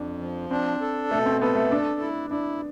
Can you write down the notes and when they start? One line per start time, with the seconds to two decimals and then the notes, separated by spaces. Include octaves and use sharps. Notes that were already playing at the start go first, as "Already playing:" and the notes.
Already playing: F2 C4 D4
0.20 F3
0.51 C4 D4
0.81 A4
1.11 B2 A3
1.26 C4
1.41 B3 A4
1.55 A3
1.70 A3 D4
2.00 E4
2.30 D4 E4